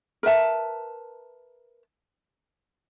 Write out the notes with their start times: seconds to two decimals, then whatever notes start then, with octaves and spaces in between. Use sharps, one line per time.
0.23 A#4 B4 E5 A5